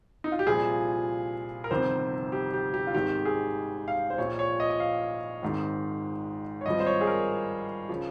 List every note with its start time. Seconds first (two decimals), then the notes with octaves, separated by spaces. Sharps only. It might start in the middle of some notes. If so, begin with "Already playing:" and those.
0.24 D#4
0.32 F4
0.39 G4
0.46 C2 A#2 F3 G#4
1.64 A#4
1.71 G1 F2 C3 D#3 C5
2.32 G4
2.53 G4
2.74 G4
2.87 F4
2.94 G#1 G#2 D#3 G4
3.25 G#4
3.88 F5
4.10 C5
4.18 A#1 A#2 F3 C#5
4.39 C#5
4.60 D#5
4.70 D#5
4.80 F5
5.42 G#1 G#2 D#3
6.61 C#5
6.66 G#1 G2 F3 D#5
6.80 C5
6.86 C#5
7.01 G#4
7.07 A#4
7.89 C#3 F3